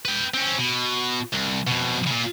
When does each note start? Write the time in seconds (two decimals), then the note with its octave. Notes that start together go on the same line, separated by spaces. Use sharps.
0.05 B4 G5
0.34 C4 C#4
0.58 B2
1.33 C2
1.67 F2 B2
2.07 A#2 C#3